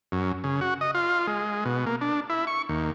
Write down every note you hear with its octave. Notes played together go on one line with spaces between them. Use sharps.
F#2
C#3
F#4
D#5
F4
G#3
B2
A#3
D4
E4
C#6
D#2